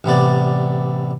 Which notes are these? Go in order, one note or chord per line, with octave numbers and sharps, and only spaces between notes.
A1 C3 B3 D5